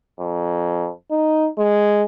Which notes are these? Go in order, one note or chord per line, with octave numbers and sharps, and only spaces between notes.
F2
D#4
G#3